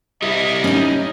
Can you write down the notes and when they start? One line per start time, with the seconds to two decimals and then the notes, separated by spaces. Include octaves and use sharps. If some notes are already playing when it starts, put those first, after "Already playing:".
0.22 G3 E4 D#5
0.64 C#4 D#4